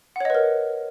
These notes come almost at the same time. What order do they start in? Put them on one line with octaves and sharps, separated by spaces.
F#5 C#5 D#5 B4 A#4